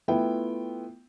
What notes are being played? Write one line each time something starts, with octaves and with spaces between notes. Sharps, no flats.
A3 B3 E4 F4 G5